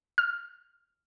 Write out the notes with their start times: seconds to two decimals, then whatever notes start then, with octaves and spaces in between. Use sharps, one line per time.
0.18 F6